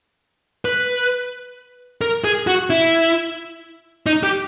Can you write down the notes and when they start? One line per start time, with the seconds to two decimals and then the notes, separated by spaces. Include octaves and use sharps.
0.65 B4
2.01 A#4
2.24 G#4
2.47 F#4
2.70 E4
4.06 D#4
4.23 G4